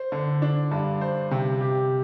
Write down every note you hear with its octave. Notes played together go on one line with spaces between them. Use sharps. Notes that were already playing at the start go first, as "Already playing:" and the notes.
Already playing: C5
D3
D4
G2
C5
C3
G4